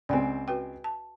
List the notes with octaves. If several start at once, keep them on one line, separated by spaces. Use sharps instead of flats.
C#2 C4 D5 G5 G#5
F#4 B4 G5
A5